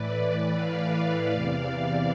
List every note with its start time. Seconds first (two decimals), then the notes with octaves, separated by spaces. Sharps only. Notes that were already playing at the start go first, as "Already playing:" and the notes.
Already playing: A2 E3 B4 D5
0.22 B4 D5
0.58 D5 F5
1.32 E2 C3 E3